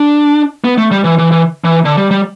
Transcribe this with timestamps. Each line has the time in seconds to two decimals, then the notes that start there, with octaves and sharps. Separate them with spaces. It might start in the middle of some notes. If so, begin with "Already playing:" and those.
Already playing: D4
0.64 B3
0.78 A3
0.91 G3
1.04 E3
1.18 E3
1.32 E3
1.64 E3
1.85 D3
1.97 G3
2.11 G3